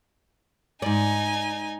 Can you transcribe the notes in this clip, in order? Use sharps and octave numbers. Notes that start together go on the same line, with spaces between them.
G#2 D#4 D5 G#5